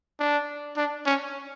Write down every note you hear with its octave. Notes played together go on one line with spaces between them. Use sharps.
D4
D4
C#4